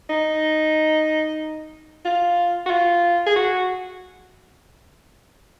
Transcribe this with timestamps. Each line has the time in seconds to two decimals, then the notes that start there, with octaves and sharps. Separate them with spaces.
0.10 D#4
2.05 F4
2.66 F#4
2.70 F4
3.26 G#4
3.36 F#4